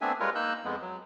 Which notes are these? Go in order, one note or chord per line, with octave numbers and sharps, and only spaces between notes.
A3 B3 C4 D4 E5 G#5
G3 G#3 F4 A#4 B4 C#5
A#3 D#4 E6 F#6 G6
F2 G#3 B3
F#3